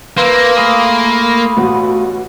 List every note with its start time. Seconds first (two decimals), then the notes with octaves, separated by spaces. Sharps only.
0.18 A#3 E4 B4 C5
0.57 A3 F4 G#4 B5
1.57 A1 B2 F#4